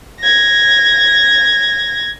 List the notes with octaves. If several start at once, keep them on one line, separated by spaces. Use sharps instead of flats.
G#6 A#6